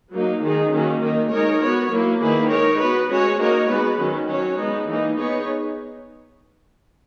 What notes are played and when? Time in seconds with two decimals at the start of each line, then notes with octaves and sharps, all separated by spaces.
0.12 F#3 A#3 D#4
0.42 D#3 G#3 D#4 G#4
0.72 D#3 F#3 A#3 C#4
1.01 D#3 A#3 D#4
1.31 G#3 D#4 A#4 C#5
1.61 B3 F#4 C#5
1.90 F#3 A#3 E4
2.20 D#3 A#3 E4 G#4 B4
2.50 G#3 D#4 A#4 C#5
2.80 B3 F#4 B4
3.09 G#3 C#4 F#4 C#5
3.38 A#3 D#4 F#4 A#4 C#5
3.68 G#3 B3 F#4 B4
3.98 D#3 F#3 C#4
4.27 F#3 C#4 F#4 C#5
4.57 G#3 B3 D#4
4.86 E3 A#3 D#4
5.17 B3 D#4 G#4 C#5